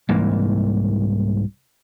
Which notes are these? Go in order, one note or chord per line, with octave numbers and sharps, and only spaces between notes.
C2 G#2 E3 A#3